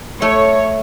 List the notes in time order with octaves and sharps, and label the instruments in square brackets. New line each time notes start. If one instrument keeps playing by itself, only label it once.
[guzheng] A3 [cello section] C#5